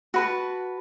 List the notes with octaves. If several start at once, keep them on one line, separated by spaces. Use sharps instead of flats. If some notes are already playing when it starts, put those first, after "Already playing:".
F#4 B4 A5